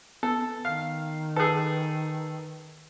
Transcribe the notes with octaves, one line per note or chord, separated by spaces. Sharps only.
B3 A4
D#3 F5
G#4 A4 B4